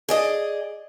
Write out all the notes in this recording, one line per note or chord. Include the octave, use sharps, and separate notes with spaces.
G#4 D5 D#5